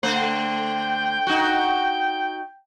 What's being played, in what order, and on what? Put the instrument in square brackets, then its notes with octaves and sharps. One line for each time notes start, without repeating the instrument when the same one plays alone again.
[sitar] D3 A3 C5
[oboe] G5
[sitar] D#4 F#4